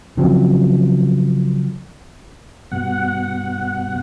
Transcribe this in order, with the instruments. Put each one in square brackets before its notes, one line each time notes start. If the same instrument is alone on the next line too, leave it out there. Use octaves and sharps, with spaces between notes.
[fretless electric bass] C#3 F3 F#3 C4
[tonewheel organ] G2 B2 F#5